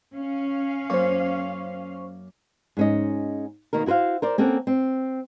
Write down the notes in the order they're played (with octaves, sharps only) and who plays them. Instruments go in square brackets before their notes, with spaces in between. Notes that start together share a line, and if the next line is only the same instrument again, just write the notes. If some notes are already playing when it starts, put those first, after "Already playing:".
[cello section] C#4 F5
[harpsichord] F#2 A#3 [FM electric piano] C5 C#6
[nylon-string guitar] G#2 C#4 D#5
B2 D#3 A#3 A#4
E4 F#4 B4 C5 F5
A#4 C5 D5
A#3 C4 C#4 A4 F#5
C4